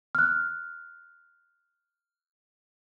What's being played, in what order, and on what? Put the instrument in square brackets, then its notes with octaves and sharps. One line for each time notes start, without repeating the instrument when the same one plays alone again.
[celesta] F6 F#6